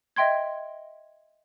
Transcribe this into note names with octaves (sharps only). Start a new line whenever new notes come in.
D#5 E5 G5 C6 G#6